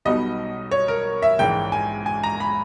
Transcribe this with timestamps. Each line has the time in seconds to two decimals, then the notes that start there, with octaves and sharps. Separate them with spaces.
0.05 B1 B2 G3 B3 D#4 D#5
0.71 C#5
0.88 A#4
1.22 E5
1.39 A#1 G#2 E3 G#3 G5
1.72 G#5
2.06 G#5
2.23 A#5
2.40 B5